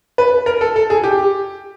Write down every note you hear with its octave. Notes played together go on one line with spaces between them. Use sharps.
B4
A#4
A4
A4
G#4
G4